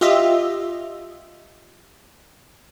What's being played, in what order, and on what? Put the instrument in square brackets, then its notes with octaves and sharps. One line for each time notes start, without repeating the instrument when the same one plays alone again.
[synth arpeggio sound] F4 G4 D#5 E5